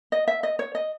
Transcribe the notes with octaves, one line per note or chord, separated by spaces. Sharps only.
D#5
E5
D#5
C#5
D#5